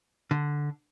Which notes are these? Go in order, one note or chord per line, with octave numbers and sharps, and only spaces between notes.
D3